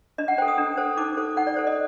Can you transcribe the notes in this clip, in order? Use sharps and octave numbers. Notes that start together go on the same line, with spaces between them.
D4 D#5
F#5
A4 C5 G5
D#6
D4
A4 C5
D#4 D6
A4 C5
D#4 F#5
D5
A4 C5
D#5